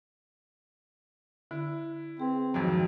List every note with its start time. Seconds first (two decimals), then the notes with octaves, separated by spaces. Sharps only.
1.51 D3 E4
2.20 C4 G#4 B4
2.54 F2 G#2 D#3 F3 F#3 A6